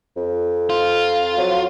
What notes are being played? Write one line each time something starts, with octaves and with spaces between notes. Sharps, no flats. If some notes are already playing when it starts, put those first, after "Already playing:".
F2
F4
F#3